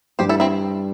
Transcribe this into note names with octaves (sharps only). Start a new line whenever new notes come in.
G2 G3 D4 G4 C5
E4 A4
C4 E4